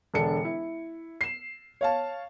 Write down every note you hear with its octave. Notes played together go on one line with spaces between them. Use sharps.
E1 D3 D4 A4 C#7
E4
C7 E7
C#5 F5 A5